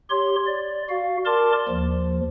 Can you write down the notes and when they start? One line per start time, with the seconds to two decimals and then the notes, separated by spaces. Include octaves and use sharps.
0.10 G4 C#5 C6
0.47 D5
0.89 F#4 F5
1.26 A#4 D5 A5 C6 D6
1.68 D#2 F3